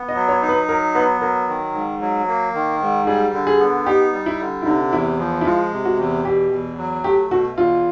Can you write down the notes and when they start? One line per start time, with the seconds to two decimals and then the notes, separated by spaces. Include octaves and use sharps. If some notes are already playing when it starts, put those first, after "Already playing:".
Already playing: B3
0.09 D#5
0.15 F#3
0.29 C#5
0.42 D#4
0.49 B4
0.68 F#3 A#4
0.95 B3 B4
1.21 F#3 A#4
1.48 D#3
1.74 G#2
2.01 F#3
2.28 A#3
2.54 D#3
2.81 G#2
3.07 G3 G#4
3.33 D3
3.47 G#4
3.60 B3
3.86 D#4 G4
4.13 G3
4.26 E4
4.40 D3
4.62 E4
4.66 C3 D#4
4.92 E2 E4
5.19 F3
5.41 E4
5.45 G#3 F4
5.72 C3
5.85 F#4
5.98 E2
6.25 B2 G4
6.51 E2
6.78 F#3
7.04 A3 G4
7.31 B2 F#4
7.58 E2 F4